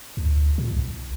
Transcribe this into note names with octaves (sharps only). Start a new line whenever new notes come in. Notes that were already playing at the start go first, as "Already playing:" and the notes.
D2
A#2
C2